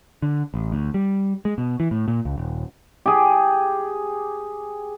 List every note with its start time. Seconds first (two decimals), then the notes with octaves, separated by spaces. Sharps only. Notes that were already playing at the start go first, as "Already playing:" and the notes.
0.22 D3
0.54 A1
0.72 D2
0.94 G3
1.45 G#3
1.58 B2
1.80 E3
1.91 A2
2.08 A#2
2.25 C#2
2.38 D#1
3.06 G4 G#4